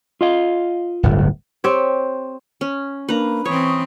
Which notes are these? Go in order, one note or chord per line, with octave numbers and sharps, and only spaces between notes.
F4 D#5 F5
D1 G1
C4 G4 C#5
C#4
A#3 D4 B4 A#5
E3 C4 C#5 C#6 D#6